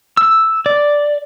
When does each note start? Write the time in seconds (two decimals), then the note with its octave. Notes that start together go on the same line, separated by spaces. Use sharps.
0.17 E6
0.66 D5